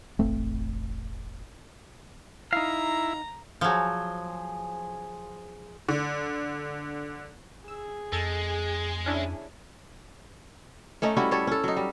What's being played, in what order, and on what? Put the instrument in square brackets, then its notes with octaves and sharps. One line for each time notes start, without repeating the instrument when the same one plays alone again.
[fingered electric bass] E1 A1 A3 C4
[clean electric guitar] D#4 F5 [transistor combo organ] E4 [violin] A#5
[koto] F3 F#3 [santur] G#4 C5
[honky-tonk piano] D3
[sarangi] G#4 [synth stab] E6
[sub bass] F2 [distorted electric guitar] G#3 [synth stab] A4 G#6 A6
[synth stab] C#4 D4 E4
[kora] A3 C#4 D#4 D#5
G3 C#4 E4 F#4
G3 A4 C#5
C#4 A4
F#3 D#4
G3